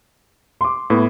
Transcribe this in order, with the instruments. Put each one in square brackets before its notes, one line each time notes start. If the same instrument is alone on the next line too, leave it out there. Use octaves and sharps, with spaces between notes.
[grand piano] C6 D6
[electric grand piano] A2 [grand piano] B3